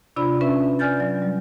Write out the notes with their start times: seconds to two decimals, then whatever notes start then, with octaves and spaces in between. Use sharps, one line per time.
0.16 C3 D4 F4 D5 B5
0.41 C#4 B4 E5
0.79 D5 G#5 F6 G6 A6
1.00 F#3 D5
1.22 G3